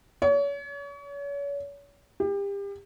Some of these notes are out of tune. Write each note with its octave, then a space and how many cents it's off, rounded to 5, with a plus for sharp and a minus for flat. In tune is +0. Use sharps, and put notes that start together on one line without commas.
C#5 +35
G4 +30